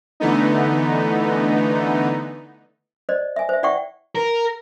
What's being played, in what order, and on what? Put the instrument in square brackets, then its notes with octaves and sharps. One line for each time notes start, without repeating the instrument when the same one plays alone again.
[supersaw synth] D3 E3 A3 B3 D#4
[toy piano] C5 D5 D#5
E5 G#5
C5 E5
E4 D5 E5 F#5 G5 C#6
[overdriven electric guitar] A#4